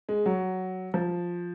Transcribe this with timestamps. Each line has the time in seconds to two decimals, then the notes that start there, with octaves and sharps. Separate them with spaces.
0.09 G#3
0.26 F#3
0.94 F3